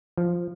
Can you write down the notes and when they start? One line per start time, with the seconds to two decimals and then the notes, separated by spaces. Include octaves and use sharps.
0.17 F3